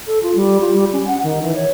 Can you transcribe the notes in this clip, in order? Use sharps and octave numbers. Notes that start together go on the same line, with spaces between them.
A4
F4
G3
F4
G3
C#4
F#5
D#3
E3
C#5